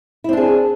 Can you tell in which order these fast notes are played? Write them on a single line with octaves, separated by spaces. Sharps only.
E4 C4 D4 G#4